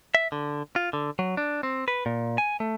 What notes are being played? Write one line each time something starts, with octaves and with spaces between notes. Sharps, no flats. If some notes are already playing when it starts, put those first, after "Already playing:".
E5
D3
F4
D3
F#3
D4
C4
B4
A#2
G#5
A3